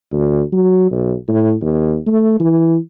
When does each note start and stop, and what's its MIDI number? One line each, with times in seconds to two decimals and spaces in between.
0.12 0.41 38
0.52 0.91 54
0.91 1.14 35
1.28 1.54 45
1.61 1.98 39
2.07 2.35 57
2.40 2.77 52